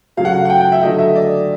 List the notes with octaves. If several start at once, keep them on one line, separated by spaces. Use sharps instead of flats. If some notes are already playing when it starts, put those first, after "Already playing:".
C#3 F#3 A3 F5
F#5
F5
F#5
G5
G5
E5
D3 F#3 A3 D#5
E5
D5